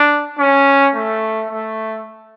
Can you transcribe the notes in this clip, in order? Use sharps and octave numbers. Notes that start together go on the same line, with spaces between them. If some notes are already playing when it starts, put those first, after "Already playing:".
Already playing: D4
C#4
A3
A3